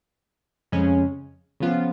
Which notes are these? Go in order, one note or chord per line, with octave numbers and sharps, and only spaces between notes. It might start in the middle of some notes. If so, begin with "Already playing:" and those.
F2 C#3 G#3 C#4
C#3 F3 B3 F4